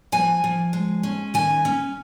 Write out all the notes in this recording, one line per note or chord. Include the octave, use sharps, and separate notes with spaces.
F3 G#5
F3
G#3
C#4
D#3 G#5
C#4